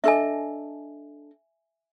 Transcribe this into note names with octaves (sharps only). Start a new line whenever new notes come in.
D4 A4 D#5 E5 G#5